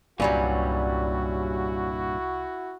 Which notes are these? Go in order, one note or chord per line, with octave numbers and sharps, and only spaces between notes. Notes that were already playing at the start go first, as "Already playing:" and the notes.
C2 G2 A#2 F#3 G3 C#4 E4 F#4